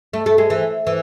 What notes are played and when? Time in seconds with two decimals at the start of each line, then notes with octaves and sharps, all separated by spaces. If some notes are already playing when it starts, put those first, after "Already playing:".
0.13 A3
0.26 A3
0.38 G#3
0.50 E3
0.87 E3